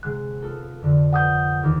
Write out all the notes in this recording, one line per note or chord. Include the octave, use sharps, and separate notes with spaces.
C3 G#3 F#5 F#6
B3 F4 A4
F2 D3
B4 F#5 A5 D#6 G6
D#2